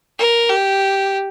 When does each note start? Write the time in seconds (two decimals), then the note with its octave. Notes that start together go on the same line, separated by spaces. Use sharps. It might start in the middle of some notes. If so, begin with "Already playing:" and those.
0.18 A#4
0.49 G4